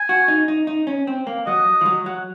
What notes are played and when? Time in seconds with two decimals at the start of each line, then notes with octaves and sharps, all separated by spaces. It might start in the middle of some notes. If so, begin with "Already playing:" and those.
Already playing: G#5
0.09 F#4
0.28 D#4
0.48 D#4
0.67 D#4
0.87 C#4
1.07 C4
1.27 A#3
1.46 F#3 D#5
1.81 F3
1.86 F#3
2.06 F#3